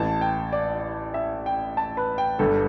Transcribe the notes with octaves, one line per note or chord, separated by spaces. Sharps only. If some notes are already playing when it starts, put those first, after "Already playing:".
Already playing: A1 A2 E3 A5
G5
D5
E5
G5
A5
B4
G5
G1 G2 D3 A4